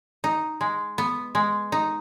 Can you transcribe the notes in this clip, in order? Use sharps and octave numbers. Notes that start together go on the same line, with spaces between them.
D#4
G#3
B3
G#3
D#4